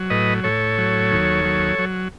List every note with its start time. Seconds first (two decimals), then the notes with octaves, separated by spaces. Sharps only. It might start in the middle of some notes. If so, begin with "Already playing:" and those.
Already playing: F#3
0.10 A2 B4 D#5
0.43 A2 A4 C#5
0.78 F#3
1.11 D#2
1.45 F#3
1.79 F#3